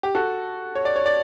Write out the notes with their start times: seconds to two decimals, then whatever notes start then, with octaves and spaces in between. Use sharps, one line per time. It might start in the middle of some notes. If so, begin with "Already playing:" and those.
0.03 G4
0.15 F#4 A4
0.75 C#5
0.85 D5
0.96 C#5
1.06 D5